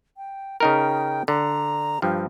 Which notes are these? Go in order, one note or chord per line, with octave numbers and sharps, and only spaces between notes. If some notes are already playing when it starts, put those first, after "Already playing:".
G5
C#3 D#4 A#4 G5
D3 A#5
G2 F3 G4